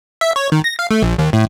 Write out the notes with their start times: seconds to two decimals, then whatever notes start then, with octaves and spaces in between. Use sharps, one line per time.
0.21 E5
0.36 C#5
0.52 D#3
0.64 A#6
0.79 F5
0.91 A3
1.02 A#1
1.18 D#2
1.33 A2